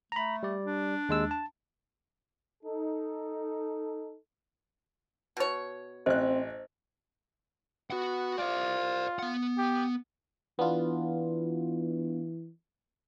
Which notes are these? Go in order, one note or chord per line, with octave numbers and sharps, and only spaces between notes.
A3 A#5 B5
G3 D5
D4
D#2 G#3 E6
A5
D#4 A4
B2 C#5
A1 C4 C5 D#5 F#6
B3 F#4 F#5
F4 C5 D5
B3 F#5
G4
E3 B3 D4 F4